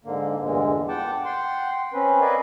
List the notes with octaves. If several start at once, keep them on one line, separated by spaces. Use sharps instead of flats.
G#2 D3 A#3
E2 G2 A#2 D3 G#3
F#5 G5 A5 D6
F#5 G5 C6
C4 C#4 B4
A#4 B4 D5 D#5 F5 G#5